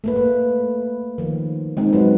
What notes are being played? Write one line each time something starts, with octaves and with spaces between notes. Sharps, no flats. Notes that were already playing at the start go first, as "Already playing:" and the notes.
A3 A#3 B4
B4
D#3 F3
G#3 C4 D#4
F#3 G#3 B4